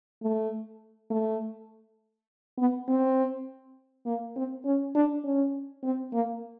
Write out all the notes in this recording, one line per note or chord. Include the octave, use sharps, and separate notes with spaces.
A3
A3
B3
C4
A#3
C4
C#4
D4
C#4
C4
A#3